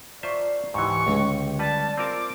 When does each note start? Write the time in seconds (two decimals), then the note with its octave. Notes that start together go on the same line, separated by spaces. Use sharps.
0.23 F4 C5 D5 E5 A5 A#5 C#6
0.74 C#2 G#2 E3 G4 C#6
1.07 C#2 D3 G#3 C#4
1.59 G3 B4 D5 A5
1.97 C4 F4 A#4 D6